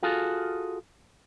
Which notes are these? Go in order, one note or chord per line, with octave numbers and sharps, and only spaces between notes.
F4 F#4 G#4 A4 F5